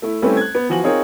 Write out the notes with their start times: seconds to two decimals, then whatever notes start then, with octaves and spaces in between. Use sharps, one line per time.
0.02 A3 E4
0.22 G3 A3 C4 C#4 E4 B4
0.37 F#6 G#6
0.55 B3
0.69 E3 F3 F#4 G#5 F#7
0.83 C4 D#4 F4 G#4 A#4 C#5